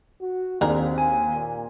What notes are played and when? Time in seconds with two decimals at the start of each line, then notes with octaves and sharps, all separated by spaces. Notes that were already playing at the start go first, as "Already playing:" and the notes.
0.21 F#4
0.61 D#2 C4 D4 G#4 A#4
0.98 G#5
1.33 A#2